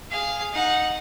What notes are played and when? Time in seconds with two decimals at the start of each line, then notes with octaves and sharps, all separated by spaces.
0.11 G#4 F5
0.53 D#4 F#5